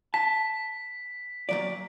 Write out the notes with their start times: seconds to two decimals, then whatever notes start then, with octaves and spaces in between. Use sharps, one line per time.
0.14 A5 B6
1.49 A#2 F#3 D5